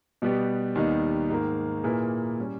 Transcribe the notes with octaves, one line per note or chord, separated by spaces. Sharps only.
B2 G3 B3 G4
D#2 D#3 G3 B3 D#4
G#2 D#3 A#3
A#2 A#3 E4 G#4 B4
G3 C#4